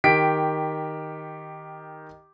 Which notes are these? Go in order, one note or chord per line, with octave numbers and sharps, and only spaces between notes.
D#3 G4 B6 D7